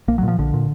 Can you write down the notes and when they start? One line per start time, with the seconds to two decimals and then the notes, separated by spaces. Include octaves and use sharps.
0.08 A#1 A#3
0.18 F#3
0.23 A#2 F3
0.39 A#1 D3
0.54 A#2